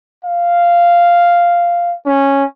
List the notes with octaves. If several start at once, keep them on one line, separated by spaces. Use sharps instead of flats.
F5
C#4